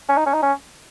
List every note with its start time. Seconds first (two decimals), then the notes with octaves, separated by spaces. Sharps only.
0.09 C#4
0.17 D#4
0.26 C#4
0.34 D#4
0.42 C#4